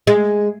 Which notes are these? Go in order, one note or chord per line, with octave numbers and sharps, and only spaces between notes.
G#3